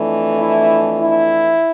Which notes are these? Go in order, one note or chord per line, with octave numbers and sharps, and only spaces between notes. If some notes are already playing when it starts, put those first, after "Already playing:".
Already playing: F2 E3 A3 D4
E4
E4